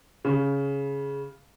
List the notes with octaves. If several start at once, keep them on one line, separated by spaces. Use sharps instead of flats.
C#3